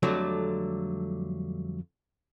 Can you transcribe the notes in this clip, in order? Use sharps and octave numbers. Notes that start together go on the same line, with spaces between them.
F2 D3 F#3 G3 A3